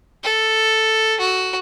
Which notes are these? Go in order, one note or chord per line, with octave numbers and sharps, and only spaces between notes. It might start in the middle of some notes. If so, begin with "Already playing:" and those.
A4
F#4